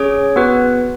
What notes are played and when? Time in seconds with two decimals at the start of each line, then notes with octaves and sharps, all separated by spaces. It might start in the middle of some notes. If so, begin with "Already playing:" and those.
Already playing: C#4 G#4 C#5
0.36 B3 F#4 B4